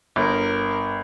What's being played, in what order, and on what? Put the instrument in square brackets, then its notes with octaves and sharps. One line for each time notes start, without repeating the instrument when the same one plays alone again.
[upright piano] G1 [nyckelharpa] A#4